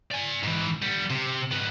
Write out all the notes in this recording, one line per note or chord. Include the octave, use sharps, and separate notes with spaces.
D5 G#5
G#2 E3
G3 B3
C3
G#2 B3